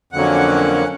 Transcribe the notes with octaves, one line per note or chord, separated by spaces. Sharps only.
F2 D3 F#3 A#3 C#4 F#5